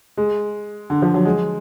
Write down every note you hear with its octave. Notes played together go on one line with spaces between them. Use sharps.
G#3
D3
F3
F#3
G#3